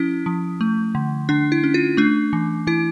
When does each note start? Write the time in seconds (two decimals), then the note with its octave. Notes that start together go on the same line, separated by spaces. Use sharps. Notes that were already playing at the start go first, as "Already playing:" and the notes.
Already playing: F3 C#4 E4
0.26 F3
0.61 A3
0.95 D3
1.29 D3 D4
1.52 E4
1.64 C#4
1.74 F4
1.97 A3 D4
2.33 E3
2.67 E3 E4